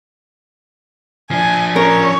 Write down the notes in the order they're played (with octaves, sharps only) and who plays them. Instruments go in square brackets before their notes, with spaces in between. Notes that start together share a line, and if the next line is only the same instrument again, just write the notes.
[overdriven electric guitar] F3 D4 [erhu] G#5
[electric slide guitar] C#4 [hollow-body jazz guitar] A#4 [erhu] C#5